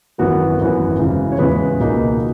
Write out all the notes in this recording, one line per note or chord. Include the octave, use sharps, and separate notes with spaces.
G#1 F#2 E3 B3 F#4 A#4
G#1 F#2 E3 B3
E2 C#3 E3 G#3
C#5
E2 C#3 E3 G#3 G#4 B4
C#2 B2 A#3 D#4